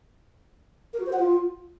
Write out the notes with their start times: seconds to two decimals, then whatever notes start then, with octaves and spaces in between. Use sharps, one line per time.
0.93 A#4
1.00 F#4
1.06 C5
1.13 F#5
1.19 F4